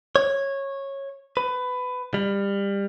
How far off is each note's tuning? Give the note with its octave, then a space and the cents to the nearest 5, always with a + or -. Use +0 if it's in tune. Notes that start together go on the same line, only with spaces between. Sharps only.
C#5 -15
B4 +20
G3 +25